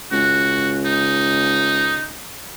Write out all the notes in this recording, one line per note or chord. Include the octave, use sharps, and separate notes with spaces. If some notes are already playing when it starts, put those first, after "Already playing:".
C#2 F#4
D#4